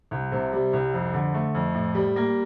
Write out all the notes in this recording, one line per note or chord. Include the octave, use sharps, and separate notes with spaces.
C2
C3
G3
C2
F2
D3
A3
F2
A2
G3
A#3